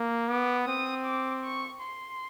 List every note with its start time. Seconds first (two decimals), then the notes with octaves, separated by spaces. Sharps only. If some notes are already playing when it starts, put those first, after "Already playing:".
Already playing: A#3
0.29 B3 D6
0.67 C4 D#6
1.06 D6
1.44 C#6
1.82 C6